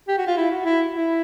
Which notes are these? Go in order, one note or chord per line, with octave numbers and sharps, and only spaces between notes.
G4
F#4
F4
E4
F#4
E4
E4